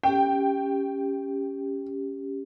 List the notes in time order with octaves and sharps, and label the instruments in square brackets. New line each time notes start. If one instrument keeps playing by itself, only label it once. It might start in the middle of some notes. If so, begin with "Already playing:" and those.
[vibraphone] C#4 G4 [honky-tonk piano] G5